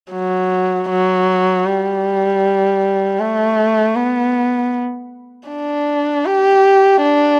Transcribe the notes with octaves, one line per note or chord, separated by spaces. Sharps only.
F#3
F#3
G3
A3
B3
D4
G4
D4